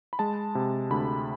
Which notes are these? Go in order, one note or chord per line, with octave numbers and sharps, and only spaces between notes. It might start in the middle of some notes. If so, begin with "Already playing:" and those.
B5
G#3 A5
C3
D2 B5